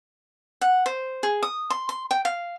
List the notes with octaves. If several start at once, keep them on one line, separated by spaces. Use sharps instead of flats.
F#5
C5
G#4
D#6
C6
C6
G5
F5